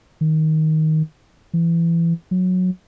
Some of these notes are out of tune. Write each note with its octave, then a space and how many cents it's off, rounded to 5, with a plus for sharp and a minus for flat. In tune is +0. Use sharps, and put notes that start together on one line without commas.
D#3 +10
E3 +25
F#3 -15